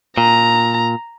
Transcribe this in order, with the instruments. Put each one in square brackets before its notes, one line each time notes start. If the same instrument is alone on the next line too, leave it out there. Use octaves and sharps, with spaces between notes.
[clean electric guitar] A#2 [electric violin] A#5